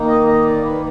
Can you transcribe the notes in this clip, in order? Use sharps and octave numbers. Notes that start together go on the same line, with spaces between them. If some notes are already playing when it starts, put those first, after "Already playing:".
Already playing: D#3 A#3 D#4
D#5
D#5
D5
B4